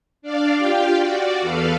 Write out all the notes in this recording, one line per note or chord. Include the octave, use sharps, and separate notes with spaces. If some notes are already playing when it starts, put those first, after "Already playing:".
D4 D5 F5
F4 G4 F5 G5
F#4 D5
E2 A4 B4 F5